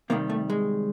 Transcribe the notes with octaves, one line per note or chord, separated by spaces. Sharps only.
C3 D#3 G3 A#3
A3
G#3